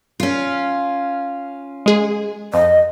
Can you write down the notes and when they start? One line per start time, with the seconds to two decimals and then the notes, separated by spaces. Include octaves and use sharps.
0.20 C#4 F4
1.86 G#3 G#4
2.54 F2 D#5